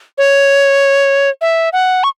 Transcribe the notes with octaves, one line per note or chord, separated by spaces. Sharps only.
C#5
E5
F#5
C#6